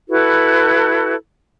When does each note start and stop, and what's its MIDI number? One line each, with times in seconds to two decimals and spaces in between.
0.09 1.14 64
0.09 1.14 66
0.09 1.14 69
0.09 1.14 71